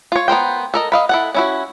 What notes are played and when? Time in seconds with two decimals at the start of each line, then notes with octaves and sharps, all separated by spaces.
0.12 F4 C#5
0.28 B3 A#4 C5 G5
0.74 A4 A#4 D#5
0.92 D#5 F5 B5
1.09 E4 A4 F#5
1.35 C#4 E4 F#4